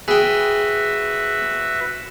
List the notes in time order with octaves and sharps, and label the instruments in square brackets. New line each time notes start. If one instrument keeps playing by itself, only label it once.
[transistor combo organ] F#4 B4 E5 [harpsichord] G#4 G5